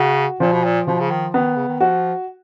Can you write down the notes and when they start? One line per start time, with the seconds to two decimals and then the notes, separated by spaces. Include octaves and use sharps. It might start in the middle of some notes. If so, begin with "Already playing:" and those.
Already playing: C#3 F#4
0.40 A#2 F3
0.52 B2
0.64 A#2
0.87 B2 F3
1.00 C#3
1.10 D#3
1.34 D#3 B3
1.56 C#3
1.68 D#3
1.80 F3 F#4